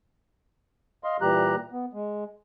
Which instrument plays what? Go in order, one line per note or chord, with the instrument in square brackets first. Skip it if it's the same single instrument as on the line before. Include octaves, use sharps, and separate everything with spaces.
[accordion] D#5 F5 C6
A#2 E3 G3 G4 A#5 F#6
B3
G#3